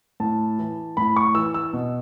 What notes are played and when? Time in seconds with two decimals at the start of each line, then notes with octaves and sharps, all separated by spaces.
0.20 A2 A5
0.59 E3
0.97 A2 B5
1.16 C#6
1.35 E3 E6
1.54 E6
1.73 B2